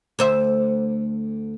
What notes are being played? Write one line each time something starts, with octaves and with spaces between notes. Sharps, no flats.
D2 C5 E5